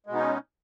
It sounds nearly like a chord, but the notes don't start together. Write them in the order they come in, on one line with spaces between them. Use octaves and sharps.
G#3 B2 B3 D#4 C#4